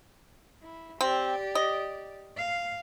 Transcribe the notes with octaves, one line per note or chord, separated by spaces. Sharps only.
E4
C4 G4 D5
D#5
F5